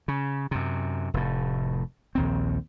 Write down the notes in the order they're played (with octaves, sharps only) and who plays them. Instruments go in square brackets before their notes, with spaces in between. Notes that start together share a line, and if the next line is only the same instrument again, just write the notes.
[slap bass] C#3
F#2 C3
F1 A2
A#1 D#2 C4